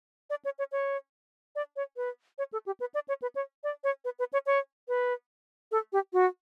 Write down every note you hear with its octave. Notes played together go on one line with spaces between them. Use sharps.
D5
C#5
C#5
C#5
D5
C#5
B4
C#5
A4
G4
B4
D5
C#5
B4
C#5
D5
C#5
B4
B4
C#5
C#5
B4
A4
G4
F#4